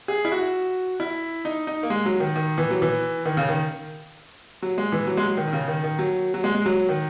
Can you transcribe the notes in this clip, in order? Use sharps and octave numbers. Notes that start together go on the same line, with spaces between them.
G#4
E4
F#4
E4
D#4
D#4
A#3
G#3
F#3
D#3
D#3
E3
F#3
E3
D#3
C#3
D#3
F#3
G#3
E3
F#3
G#3
F#3
D#3
D#3
C#3
D#3
D#3
F#3
F#3
G#3
G#3
F#3
D#3